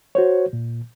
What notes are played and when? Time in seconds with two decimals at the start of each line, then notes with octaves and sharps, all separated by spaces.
0.15 F#4 C5 C#5
0.53 A#2